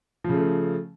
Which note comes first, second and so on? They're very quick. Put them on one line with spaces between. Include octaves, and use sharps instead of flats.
F3 C#3 A3